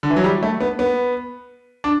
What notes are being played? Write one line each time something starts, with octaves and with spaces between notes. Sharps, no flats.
D3
E3
F#3
G3
A3
B3
B3
D4